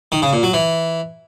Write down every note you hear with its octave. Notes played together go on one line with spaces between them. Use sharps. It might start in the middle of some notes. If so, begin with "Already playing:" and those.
D#3
C#3
A#2
F#3
E3